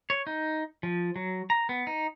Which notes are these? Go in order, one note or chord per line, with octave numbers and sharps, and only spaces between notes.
C#5
D#4
F3
F#3
A#5
B3
D#4